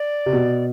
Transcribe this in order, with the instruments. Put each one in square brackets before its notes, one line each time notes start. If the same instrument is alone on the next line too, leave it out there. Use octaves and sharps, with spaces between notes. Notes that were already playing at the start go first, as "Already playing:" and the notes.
Already playing: [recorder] D5
[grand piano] C3
B2